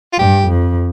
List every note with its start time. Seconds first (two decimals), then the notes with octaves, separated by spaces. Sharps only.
0.13 F4
0.18 G2 G4
0.48 F2